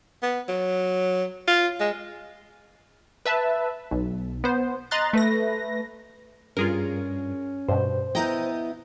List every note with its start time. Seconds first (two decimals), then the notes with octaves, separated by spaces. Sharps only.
0.22 B3
0.48 F#3
1.47 F4
1.80 G#3
3.26 B4 E5 A5
3.91 B1
4.44 B3 C5
4.91 D#5 A#5 C6 F#6 A6
5.13 A3 B4 A#6
6.57 G2 C#4 F4 G#4 A#4
7.69 G2 B2 C5
8.15 B3 E4 D#5 G5 A#5 G6